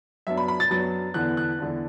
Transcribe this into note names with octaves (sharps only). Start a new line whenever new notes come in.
F#2 F#3 B3 D4 E5
B5
B5
A6
F#2 F#3 B3 D4 A6
E2 D3 B3 D4 F#6
F#6
E2 D3 B3 D4